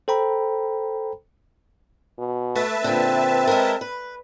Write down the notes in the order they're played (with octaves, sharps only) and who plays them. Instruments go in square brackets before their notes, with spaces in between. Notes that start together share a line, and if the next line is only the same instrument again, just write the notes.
[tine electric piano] A4 C5 G5 A#5 B5
[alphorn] B2
[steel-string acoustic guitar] A3 [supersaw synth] B4 E5 A5
[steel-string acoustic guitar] A#2 D3 [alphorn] C4
[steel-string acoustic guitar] G#3 A4 A#4
B4